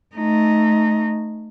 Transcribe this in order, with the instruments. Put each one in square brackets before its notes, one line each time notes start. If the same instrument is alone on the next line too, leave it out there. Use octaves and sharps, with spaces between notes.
[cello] A3 D#4